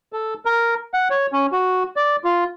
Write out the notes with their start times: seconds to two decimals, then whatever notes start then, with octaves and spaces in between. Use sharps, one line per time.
0.13 A4
0.45 A#4
0.94 F#5
1.10 C#5
1.33 C#4
1.52 F#4
1.96 D5
2.24 F4